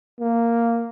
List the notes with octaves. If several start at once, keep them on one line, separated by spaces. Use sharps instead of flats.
A#3